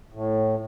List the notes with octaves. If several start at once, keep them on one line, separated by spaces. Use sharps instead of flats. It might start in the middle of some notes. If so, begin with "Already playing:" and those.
A2